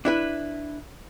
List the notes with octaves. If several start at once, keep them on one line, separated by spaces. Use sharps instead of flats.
D4 E4 B4